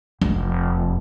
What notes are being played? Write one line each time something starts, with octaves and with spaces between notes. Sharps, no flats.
F1